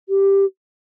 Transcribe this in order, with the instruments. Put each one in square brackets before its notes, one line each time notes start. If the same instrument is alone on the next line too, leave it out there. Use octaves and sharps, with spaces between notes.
[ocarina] G4